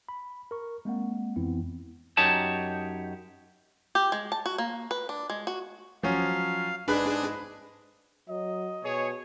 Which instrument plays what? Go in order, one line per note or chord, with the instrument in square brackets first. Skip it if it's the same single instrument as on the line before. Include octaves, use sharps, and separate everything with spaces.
[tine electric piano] B5
A#4 C#6
G#3 A#3 C4 F#5
F2 E3 B3 C4 E4
[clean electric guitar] F#2 D#4 G4 C#5 A5
[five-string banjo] G4
G#3
A5
F#4
A#3
B4
D4
G#3
F#4
[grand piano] F3 F#3 C#4 [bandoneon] F5
[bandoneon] G#2 G#3 [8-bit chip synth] D4 G#4 [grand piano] B4 B5 F#6
[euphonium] F#3 [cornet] D#5
[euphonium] B2 [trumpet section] G#4 C#5